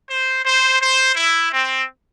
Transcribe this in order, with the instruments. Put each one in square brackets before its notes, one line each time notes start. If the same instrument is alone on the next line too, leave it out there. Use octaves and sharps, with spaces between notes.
[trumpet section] C5
C5
C5
E4
C4